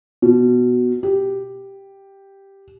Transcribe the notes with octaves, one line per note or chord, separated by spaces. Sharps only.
B2
G4